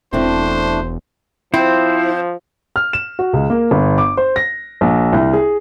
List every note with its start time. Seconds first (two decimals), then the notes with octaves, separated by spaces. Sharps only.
0.13 E1 E3 A3 C4 D4 E4 C5
1.54 F3 C4 E4 C5
2.76 F6
2.93 E7
3.19 F#4
3.33 C#2
3.50 A#3
3.71 G1
3.98 D6
4.17 C5
4.36 A#6
4.81 A#1
5.13 C2
5.33 G#4